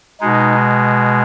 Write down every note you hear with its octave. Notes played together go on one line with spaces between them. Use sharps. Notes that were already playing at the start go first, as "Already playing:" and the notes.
B2 G#3 D#4